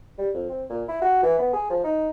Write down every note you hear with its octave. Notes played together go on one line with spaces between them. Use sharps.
G3
F2
C4
A#2
E4
F#4
E3
B3
G#4
F3
D#4